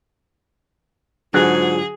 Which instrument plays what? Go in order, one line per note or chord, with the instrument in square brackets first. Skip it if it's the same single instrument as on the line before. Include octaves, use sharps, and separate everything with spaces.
[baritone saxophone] G#2 [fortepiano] D3 F#3 F#6 [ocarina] F4 [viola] G#4